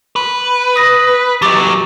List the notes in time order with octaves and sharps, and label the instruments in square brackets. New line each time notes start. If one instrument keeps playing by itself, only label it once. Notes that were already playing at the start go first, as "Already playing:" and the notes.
[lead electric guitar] B4
[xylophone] D#6 A#6
[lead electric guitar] F#3 D#4 [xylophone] G4 D6 A6